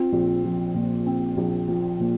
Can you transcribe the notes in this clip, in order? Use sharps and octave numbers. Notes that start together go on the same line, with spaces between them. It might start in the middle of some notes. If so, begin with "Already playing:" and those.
Already playing: C4 F4
A#1
F3
A#2
C4
A#1
F3
A#2